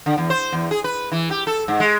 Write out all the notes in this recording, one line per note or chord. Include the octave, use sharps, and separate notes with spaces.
D3
E2
C5
E2
G#4
B4
E3
G4
A4
G#2
G#3